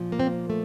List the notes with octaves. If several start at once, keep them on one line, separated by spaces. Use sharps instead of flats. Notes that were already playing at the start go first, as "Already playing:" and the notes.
Already playing: A#2 F3
A#3
C4
A#3
A3